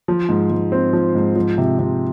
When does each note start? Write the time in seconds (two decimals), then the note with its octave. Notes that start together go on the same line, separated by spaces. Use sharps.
0.08 F3
0.29 G#2
0.50 G#2
0.72 C4
0.93 F3
1.15 G#2
1.36 F3
1.58 C3
1.79 C3